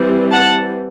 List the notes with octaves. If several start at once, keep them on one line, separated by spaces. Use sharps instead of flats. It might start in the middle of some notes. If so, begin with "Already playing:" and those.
Already playing: E3 G3 C4
F#5 A5